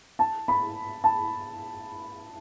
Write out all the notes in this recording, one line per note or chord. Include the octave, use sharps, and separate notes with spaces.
A5
B5
A5